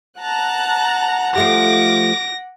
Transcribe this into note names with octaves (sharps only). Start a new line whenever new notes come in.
F#5 A5 A#5 F#6
F3 A3 G4 D6 A#6